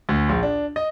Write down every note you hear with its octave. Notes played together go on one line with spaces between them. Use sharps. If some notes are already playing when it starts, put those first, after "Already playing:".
D2
A#1
D4
D#5